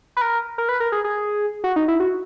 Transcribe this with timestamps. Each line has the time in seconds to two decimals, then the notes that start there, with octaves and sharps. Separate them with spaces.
0.17 B4
0.21 A#4
0.58 A#4
0.69 B4
0.80 A#4
0.92 G#4
1.04 G#4
1.64 F#4
1.76 D#4
1.88 E4
2.00 F#4